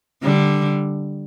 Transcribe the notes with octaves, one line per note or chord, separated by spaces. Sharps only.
D3 G3